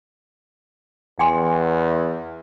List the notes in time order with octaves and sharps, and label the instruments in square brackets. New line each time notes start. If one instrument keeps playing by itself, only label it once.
[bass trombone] E2 [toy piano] G5 G#5 C6